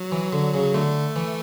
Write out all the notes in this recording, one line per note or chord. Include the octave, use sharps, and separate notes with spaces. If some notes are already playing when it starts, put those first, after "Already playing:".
Already playing: F#3
E3
D3
C#3
D3 A3
E3